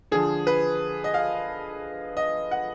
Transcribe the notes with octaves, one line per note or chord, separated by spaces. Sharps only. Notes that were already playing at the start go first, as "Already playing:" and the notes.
D3 F3 G#4
B4
D#5
F5
D#5
F#5